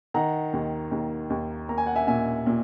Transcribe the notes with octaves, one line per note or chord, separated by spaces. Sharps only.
D#3 F#5 A#5
D#2
D#2
D#2
A#3 A#5
G#5
F#5
E5 G#5
A#2 E5 G#5
A#2